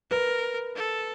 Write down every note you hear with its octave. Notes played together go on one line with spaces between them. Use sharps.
A#4 B4
A4